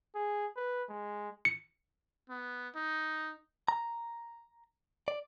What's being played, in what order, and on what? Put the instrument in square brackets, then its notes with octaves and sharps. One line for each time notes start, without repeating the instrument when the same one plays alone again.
[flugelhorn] G#4
B4
G#3
[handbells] C#7
[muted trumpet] B3
D#4
[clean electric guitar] A#5
D5